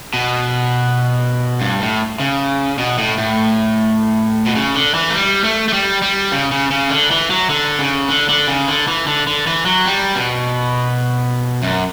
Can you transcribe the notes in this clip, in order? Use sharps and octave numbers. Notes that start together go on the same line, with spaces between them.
B2
G2
A2
C#3
B2
A2
A2
B2
C#3
D3
E3
A3
G3
A3
A3
G3
G3
C#3
C#3
C#3
D3
E3
F#3
D3
C#3
D3
D3
C#3
D3
E3
D3
D3
E3
F#3
G3
B2
F#2